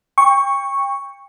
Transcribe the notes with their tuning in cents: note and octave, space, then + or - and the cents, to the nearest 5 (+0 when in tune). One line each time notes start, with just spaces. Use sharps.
G5 +30 C#6 +0